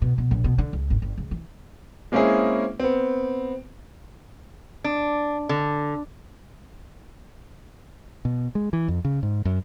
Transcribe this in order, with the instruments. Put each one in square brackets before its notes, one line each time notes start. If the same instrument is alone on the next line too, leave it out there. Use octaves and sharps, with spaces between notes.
[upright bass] B2
B2
A#1
B2
D3
C#2
G#1
G1
C#2
E3
[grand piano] G#3 A#3 C4 C#4 E4 G#4
B3 C4
[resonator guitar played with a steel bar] D4
D3
[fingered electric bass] B2
G#3
E3
F2
C#3
G#2
F#2